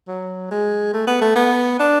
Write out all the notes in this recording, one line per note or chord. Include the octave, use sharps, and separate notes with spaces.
F#3
G#3
A3
B3
A3
B3
D4